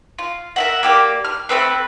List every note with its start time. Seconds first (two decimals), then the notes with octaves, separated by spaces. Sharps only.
0.19 F4
0.56 A#4 E5 F#5
0.83 A#3 G4 D5
1.24 F6
1.49 A3 B3 C4 B4